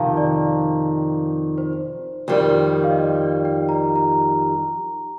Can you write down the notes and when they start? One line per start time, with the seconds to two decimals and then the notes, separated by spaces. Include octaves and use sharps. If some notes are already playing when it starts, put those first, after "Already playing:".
Already playing: F2 C3 D#3 F5 A5 A#5
0.17 D5
1.58 C5
2.28 F2 D#3 G3
2.84 F5
2.91 D#5
2.98 D5
3.22 D5
3.45 G5
3.69 A#5
3.96 A#5